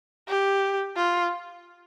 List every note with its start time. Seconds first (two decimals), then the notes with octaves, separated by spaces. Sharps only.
0.28 G4
0.96 F4